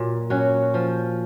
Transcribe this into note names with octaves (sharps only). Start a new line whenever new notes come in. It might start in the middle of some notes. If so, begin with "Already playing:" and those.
Already playing: A#2 F#3
F#3 C#4 F#4
F3